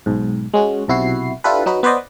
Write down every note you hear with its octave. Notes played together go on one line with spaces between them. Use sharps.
B1 G#2
G#3 C#4 F#4
B1 C3 E4 F#4 C7
D4 E4 F4 G4 A4 B4
F#3 D#4 F#4 B4
B3 B4 C5 D5 D#5